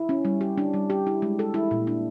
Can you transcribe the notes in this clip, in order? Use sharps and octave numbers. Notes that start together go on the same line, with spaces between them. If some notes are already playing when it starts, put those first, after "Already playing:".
Already playing: E4
C#4
G3
G4
D4
G3
G4
E4
G#3
A4
E4
A#2
D4